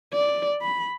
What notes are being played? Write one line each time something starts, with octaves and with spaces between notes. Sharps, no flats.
D5
B5